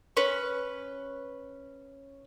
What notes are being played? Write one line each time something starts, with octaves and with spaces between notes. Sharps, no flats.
C#4 B4